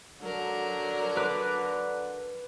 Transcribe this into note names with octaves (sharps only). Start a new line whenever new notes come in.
D3 F#3 A#4
B4 D6